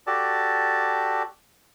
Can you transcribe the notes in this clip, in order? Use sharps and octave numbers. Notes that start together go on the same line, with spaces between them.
F#4 G4 A4 D5 A5